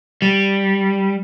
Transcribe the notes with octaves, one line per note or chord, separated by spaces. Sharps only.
G3